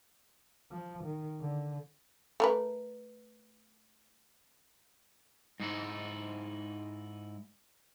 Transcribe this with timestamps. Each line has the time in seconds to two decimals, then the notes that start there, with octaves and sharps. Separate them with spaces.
0.71 F3
1.04 D#3
1.41 D3
2.40 A3 A#4 B4
5.60 G#2 D#4 E4